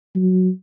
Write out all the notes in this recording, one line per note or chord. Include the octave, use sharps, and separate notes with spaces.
F#3